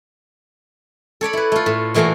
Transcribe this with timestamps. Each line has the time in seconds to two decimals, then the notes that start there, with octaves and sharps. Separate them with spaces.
1.21 A4 C#5 D5 B5
1.33 E4 B4
1.52 A3 F4
1.66 A2
1.94 A#2 E3 A3 F#4 F5 A#5